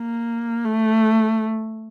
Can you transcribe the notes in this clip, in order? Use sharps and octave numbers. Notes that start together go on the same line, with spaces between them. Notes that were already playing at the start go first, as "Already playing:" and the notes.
Already playing: A#3
A3